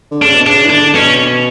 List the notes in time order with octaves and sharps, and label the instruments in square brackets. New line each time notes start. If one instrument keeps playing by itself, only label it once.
[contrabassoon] D3
[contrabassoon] C#3 [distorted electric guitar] D4
[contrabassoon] B2
[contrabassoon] C#3 [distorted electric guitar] D4
[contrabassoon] E3
[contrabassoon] D3 [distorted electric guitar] D4
[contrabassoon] B2 [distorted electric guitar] C#4